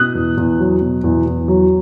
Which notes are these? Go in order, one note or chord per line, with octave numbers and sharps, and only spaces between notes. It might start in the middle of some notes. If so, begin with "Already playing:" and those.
Already playing: B2 D#6 F#6
E2
E2
F#3
B2
E2
E2
F#3